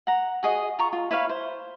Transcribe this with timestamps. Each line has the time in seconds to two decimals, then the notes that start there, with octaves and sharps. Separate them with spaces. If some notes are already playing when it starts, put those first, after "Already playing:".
0.07 F#5 A#5
0.43 F#4 G#4 D#5
0.79 F4 A#5 C#6
0.93 F4
1.11 E4 B4 C#5 F5
1.29 C5